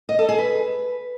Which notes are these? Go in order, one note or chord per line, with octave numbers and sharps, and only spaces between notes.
D#5
A4
G#4
B4